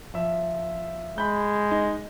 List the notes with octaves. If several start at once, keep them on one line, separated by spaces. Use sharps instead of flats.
F3 E5
G#3 B5 G6
D#4